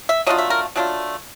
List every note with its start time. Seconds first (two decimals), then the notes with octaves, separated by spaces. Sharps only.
0.09 E5
0.27 F#3 A3 D4 F4 D#5
0.38 E5
0.50 A#4
0.76 F#3 A3 D4 F4 F#4